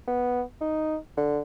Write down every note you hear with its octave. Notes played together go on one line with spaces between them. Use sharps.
B3
D#4
D3